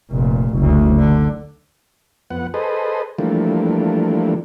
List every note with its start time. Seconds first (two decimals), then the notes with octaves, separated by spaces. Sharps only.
0.12 F1 A#2
0.57 F#1 D2
0.99 D3
2.30 F2 B3 F#5
2.54 G#4 A4 B4 C5 D#5
3.18 E3 F3 G3 A3 A#3 D4